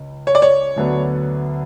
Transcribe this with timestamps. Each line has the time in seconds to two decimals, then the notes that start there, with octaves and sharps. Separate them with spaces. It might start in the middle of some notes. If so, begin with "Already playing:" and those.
Already playing: C#2 C#3
0.27 C#5
0.35 D5
0.42 C#5
0.76 D2 D3 F#3 B3 D4